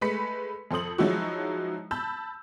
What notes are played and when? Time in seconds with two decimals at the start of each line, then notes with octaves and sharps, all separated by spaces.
0.01 G#3 A3 B4 B5 B6 C#7
0.71 F2 A4 C5 D#6 F#7
0.98 F3 F#3 G#3 D#4 E4 F#4
1.91 A5 B5 E6 G6